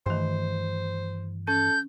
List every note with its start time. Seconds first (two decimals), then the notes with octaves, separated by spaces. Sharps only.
0.06 G2 D#3 E3 A3 C5 C6
1.47 C#4 A4 G6